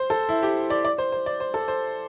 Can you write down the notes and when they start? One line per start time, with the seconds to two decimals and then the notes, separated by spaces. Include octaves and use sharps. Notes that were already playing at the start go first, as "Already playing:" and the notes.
Already playing: C5
0.10 A4
0.29 E4
0.43 G4
0.70 D5
0.85 D5
0.98 C5
1.12 C5
1.26 D5
1.40 C5
1.54 A4
1.68 C5